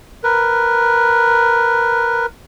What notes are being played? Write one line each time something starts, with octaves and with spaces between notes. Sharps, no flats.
A#4 B4